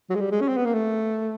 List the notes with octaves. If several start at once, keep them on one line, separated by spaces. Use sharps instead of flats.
F#3
G#3
G3
G#3
C#4
C4
B3
A#3
A3